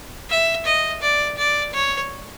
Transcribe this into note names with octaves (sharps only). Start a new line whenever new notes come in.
E5
D#5
D5
D5
C#5